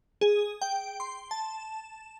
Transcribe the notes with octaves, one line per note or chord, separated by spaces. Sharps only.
G#4
G5
C6
A5